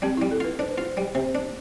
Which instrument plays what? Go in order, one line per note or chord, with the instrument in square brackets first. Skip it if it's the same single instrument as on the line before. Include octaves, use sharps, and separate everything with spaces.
[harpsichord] G3 [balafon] C4
[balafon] E4
[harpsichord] G3
[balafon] A4
[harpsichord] F4 [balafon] B4
[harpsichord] D4 [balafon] C5
[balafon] B4
[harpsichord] F4 [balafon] C5
[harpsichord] G3
C3
D4